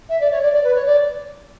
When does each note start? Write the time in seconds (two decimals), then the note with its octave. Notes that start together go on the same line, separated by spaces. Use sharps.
0.09 E5
0.21 D5
0.31 C#5
0.43 D5
0.53 D5
0.64 B4
0.75 C#5
0.86 D5